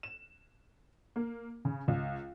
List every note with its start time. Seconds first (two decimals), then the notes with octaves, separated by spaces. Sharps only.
0.03 E7
1.16 A#3
1.65 C#3
1.88 C#2